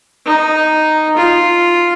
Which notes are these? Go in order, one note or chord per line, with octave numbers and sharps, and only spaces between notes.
D#4
F4